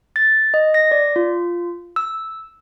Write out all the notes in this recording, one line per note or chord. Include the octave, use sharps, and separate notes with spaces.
A6
D#5
A#6
D5
F4
E6